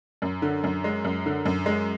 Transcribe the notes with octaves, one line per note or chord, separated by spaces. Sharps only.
F#2
D3
F#2
G#3
F#2
D3
F#2
G#3